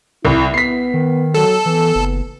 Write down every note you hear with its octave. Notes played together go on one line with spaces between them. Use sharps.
C2 E4
B3 B6 C7
D#3
F#3 A4
E3 B3
F#1